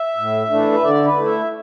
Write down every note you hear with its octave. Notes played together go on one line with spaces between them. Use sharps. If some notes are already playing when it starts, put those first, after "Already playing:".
Already playing: E5
A2
E3 A3 D4
B4
D3 D5
B4
A3 E4
E5